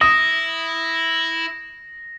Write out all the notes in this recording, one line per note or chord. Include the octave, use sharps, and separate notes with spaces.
E4 D#6 A#6